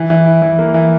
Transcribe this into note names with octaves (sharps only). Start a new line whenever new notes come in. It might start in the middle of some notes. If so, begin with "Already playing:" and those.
Already playing: E3
E3
E4
E3
A#3
E3